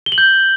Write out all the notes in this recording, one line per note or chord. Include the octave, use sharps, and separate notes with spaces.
G7
F#7
G6